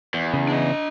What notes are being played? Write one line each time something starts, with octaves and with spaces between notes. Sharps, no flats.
E2
C#3
D4 D#5